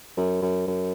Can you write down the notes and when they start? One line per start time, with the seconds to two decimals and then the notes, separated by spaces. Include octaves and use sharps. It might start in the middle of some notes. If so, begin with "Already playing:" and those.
0.17 F#2
0.42 F#2
0.67 F#2